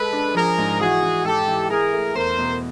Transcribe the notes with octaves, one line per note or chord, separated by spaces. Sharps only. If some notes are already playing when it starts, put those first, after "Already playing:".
Already playing: G#3 A4 B4
D4
F3 G#4 A#4
G#2
E3 F#4 G#4
E3
G#2 G4 A4
E3
E3 G#4 A#4
A3
E2 A#4 C5
B2